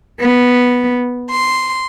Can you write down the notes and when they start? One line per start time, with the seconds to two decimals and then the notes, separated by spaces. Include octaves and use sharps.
0.18 B3
1.30 C6